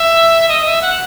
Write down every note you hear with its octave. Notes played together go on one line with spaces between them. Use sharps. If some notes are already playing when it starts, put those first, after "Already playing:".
Already playing: E5
D#5
E5
F#5